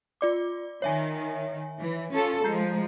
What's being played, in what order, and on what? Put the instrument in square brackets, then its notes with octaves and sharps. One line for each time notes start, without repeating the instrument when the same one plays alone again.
[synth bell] F4 D5 D6
[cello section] D#3 [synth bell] C#5 E5 G#5
[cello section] E3
C#4 F4 A4
[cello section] F3 G#3 [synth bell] A#5 G6 C7